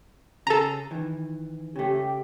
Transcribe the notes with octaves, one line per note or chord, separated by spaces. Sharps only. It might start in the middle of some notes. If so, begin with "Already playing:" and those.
C#3 G#4 A4 A#5
D#3 E3
C#3 A3 G4